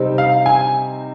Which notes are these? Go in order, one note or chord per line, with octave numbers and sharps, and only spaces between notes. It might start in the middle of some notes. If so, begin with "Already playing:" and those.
Already playing: C3 G3 C4 D#4
F5
G#5